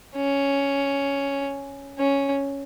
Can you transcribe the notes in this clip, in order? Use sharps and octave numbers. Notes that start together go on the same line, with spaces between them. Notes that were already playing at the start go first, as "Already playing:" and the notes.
C#4
C#4